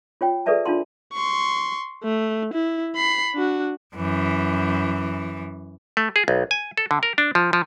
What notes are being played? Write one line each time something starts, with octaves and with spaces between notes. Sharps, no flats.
F4 C#5 G5
G#4 A4 B4 D5 E5 A5
D4 F4 F5 A5 C6
C6 C#6
A3
E4
B5 C7
D4 F#4
F#2 E3
A3
G#4
B1
G#5
A4
D3
A#4
D4
F3
F3